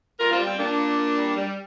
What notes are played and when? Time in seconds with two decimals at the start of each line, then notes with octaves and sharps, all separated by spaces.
0.19 G3 F4 A#4
0.31 C4 F4
0.38 G3
0.45 C4
0.58 A#2 A#3 D4
0.78 A#2
0.98 A#2
1.17 G3
1.37 G3